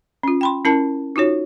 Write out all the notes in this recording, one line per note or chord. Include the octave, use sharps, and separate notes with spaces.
C#4 F4
G5 B5 C6
C#4 E4 A#4 A5
D#4 F4 F#4 C#5